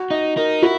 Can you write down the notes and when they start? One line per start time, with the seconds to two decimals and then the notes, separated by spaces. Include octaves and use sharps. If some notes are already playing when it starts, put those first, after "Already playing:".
Already playing: F#4
0.10 D#4 D#5
0.37 D#4 A#4
0.62 E4 F#4